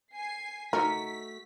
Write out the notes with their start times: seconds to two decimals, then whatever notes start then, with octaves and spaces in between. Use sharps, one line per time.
0.14 G#5 C7
0.73 A3 D#4 F#4 A#4 B6